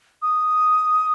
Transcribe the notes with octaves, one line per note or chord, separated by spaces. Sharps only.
D#6